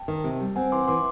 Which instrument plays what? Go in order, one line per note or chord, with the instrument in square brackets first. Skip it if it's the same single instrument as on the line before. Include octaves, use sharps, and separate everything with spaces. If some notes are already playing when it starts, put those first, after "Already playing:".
Already playing: [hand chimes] G5 A5
[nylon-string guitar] D#3
C3
G3
[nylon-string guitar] C4 [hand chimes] F#5 G#5
[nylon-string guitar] E3 [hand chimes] C6 D6
[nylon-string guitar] E3 [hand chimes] C6 D6